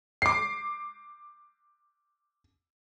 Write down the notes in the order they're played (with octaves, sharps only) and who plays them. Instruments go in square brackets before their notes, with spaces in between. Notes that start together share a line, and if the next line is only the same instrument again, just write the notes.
[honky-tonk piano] D6 C7